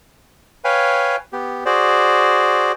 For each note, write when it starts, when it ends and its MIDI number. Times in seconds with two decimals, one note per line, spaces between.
0.64 1.16 71
0.64 1.16 73
0.64 1.16 77
0.64 1.16 79
0.64 1.16 80
1.33 1.64 59
1.33 1.64 67
1.65 2.72 66
1.65 2.72 68
1.65 2.72 72
1.65 2.72 74